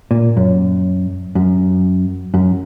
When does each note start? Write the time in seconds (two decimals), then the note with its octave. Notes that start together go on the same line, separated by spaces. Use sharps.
0.11 A#2
0.37 F#2
1.35 F#2
2.34 F#2